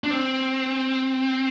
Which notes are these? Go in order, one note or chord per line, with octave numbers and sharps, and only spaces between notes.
D4
C4